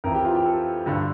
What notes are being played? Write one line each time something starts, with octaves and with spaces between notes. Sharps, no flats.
F2 E3 A#4
G4
F4
G4
A4
G2 D3